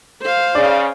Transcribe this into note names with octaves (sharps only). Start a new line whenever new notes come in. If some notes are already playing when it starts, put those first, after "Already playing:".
C5 F5
C#3 D5